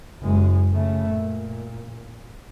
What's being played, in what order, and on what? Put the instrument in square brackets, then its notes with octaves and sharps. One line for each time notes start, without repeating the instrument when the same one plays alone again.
[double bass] F#1 G#3
C#3 A3
A#2